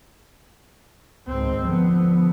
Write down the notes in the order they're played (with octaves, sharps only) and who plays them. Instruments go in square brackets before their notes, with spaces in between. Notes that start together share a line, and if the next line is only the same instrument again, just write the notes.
[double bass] G#1 C4 [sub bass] C#2
[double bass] D3 B3 [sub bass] F3